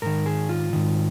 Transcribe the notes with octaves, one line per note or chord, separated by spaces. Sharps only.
G#2 D#3 A#4
G#4
F4
G#2 D#3